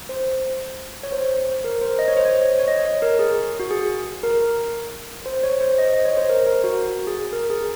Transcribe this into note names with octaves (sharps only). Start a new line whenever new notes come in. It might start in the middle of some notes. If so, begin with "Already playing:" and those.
C5
C#5
C5
A#4
C5
D#5
C#5
C5
C#5
C#5
D#5
C#5
A#4
G#4
F#4
G#4
A#4
C5
C#5
C5
D#5
D#5
C#5
C5
A#4
A#4
F#4
F#4
G#4
A#4
G#4